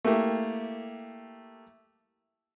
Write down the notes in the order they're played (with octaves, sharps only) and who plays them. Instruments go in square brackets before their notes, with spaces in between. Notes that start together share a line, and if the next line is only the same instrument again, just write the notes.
[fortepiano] A3 A#3 E4 G4 A#4